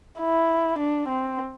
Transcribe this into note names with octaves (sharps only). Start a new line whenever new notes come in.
E4
D4
C4